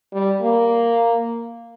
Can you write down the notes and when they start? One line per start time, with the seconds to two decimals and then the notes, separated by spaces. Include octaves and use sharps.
0.13 G3
0.42 A#3